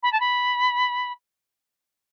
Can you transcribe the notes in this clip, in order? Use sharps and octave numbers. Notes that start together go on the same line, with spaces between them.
B5
A5
B5